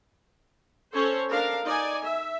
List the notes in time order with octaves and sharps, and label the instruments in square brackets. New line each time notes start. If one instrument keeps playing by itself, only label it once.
[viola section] C#4 A4 C5 C#5
D4 A#4 F5
D#4 D5 G#5
E5